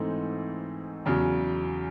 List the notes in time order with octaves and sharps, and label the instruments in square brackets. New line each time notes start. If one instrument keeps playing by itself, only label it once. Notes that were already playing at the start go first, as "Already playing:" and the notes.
Already playing: [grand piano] G#2 E3 A3 C4 D#4
E2 C#3 F#3